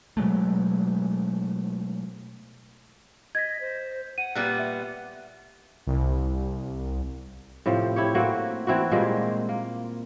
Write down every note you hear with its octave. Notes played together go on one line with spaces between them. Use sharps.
B2 F#3 G#3 A3
D#5 G#6 B6
C5
F#5 D#7
A#2 G3 B3 F#6
E5
C2
A2 C3 F3
E4 G4 C#5
A3 A#3 C4 F#4
E3 C4 E4 F#4
A#2 G3 G#3 A#3
A#3